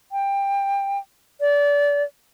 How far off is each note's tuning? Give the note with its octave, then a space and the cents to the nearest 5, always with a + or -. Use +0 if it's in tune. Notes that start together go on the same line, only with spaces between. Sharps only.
G5 +20
D5 -30